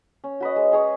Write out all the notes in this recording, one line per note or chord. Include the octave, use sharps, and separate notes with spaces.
C#4
F#4 B4 D#5
G#3
C#4 G#4 C#5